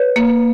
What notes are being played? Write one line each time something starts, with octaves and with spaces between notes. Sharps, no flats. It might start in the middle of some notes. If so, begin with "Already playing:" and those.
Already playing: B4 C#5
A#3